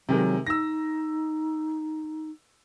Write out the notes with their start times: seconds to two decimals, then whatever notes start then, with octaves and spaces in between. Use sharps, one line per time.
0.09 C3 D#3 F#3 G#3
0.47 D#4 E6 A#6